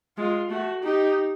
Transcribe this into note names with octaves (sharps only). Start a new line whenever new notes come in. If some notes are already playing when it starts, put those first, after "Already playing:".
G#3 F4
A3 F#4
D#4 G4